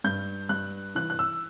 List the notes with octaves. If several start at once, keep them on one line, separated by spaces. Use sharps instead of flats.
G2 G6
G2 F#6
E3 F#6
F#6
E6